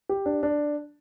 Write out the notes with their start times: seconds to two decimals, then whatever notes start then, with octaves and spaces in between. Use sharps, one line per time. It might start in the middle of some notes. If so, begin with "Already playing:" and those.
0.09 G4
0.26 D4
0.43 D4